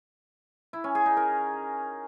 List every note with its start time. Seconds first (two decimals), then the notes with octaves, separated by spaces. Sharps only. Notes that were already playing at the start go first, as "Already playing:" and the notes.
0.73 E4
0.84 C#4
0.95 G#4
1.06 D#4
1.17 A#4